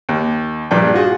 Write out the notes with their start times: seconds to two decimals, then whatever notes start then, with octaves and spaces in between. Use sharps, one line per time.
0.09 D#2
0.71 A#1 G2 A#2 D4 G5 D6
0.94 F4 F#4 G#4